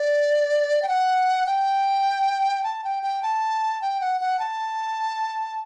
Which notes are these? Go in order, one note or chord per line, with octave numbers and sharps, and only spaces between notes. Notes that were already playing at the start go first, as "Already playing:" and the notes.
Already playing: D5
G5
F#5
G5
A5
G5
G5
A5
G5
F#5
F#5
A5